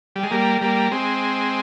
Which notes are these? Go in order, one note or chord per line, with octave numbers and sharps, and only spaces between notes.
G3
G#3
G3 A#3
G3 A#3
G#3 C4